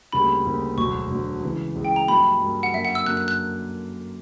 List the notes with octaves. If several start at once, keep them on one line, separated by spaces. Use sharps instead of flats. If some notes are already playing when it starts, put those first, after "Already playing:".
D2 C#3 G3 A#3 B5
D2 C#3 G3 A#3
E1 D2 D3 F#3 C#6
E1 D2 D3 F#3
C#2 C#3 E3
C#2 C#3 E3
G5
A#5
G2 F#3 A#3 B5
G2 F#3 A#3
F#5
F#2 D3 A#3 E5
F#5
E6
F#2 D3 A#3 F#6
F#6
F#6